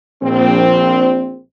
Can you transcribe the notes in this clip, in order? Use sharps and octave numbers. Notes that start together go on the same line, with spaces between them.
A#1 C4